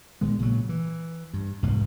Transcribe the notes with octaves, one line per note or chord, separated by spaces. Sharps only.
A#1 D#3 G#3 B3
A#2 C#3 F#3
E3
G2
F1 C2 G#2 B2